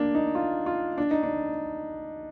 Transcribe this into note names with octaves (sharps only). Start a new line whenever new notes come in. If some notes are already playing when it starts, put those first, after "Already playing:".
Already playing: A#3 D4
D#4
F4
F4
D4
D#4
D4